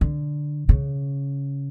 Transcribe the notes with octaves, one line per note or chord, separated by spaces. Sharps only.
D3
C#3